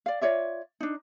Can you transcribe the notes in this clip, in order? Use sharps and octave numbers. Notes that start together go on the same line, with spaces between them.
D5 F5
F4 C#5 D5 E5
D4 D#4